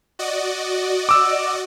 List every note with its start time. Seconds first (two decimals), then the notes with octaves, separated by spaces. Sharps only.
0.19 F#4 D5 D#5
1.09 D6 E6